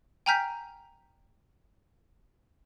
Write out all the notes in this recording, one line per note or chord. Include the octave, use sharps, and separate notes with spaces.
G5 G#5 A#5 F6 G6 B6